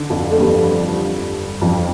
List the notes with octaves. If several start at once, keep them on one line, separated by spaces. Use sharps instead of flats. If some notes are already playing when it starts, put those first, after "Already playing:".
Already playing: D3
F2 F3
A3
G2 G3
F2 F3